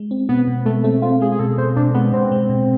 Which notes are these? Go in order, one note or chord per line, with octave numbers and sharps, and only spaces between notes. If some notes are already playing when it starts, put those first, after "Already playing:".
Already playing: G#3
C4
B2 B3
B2
G#3 A3
A3 C4
C4 F4
G#3 G#4
G#4
B2 A4
B2 C5
B2 D4
G#3 B3
B2 C4
G#3
B2